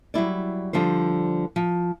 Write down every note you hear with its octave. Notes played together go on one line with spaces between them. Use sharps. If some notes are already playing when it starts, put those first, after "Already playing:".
F#3 G3 E4 D5
D3 F3 G3 C5
F3